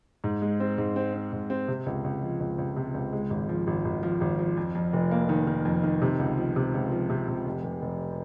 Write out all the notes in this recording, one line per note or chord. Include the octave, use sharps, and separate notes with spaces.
G#2
G#3
C4
G#2
C4
C4
G#2
C4
C3
C#2
C#2
F3
C#2
C#2
C3
C#2
G#3
G#1
F3
G#1
G#1
F3
G#1
F3
F2
F2
F1
A#3
D#3
D#3
F2
D#3
C3
C#2
F3
C3
C#2
F3
C3
C3
F1
F1
F1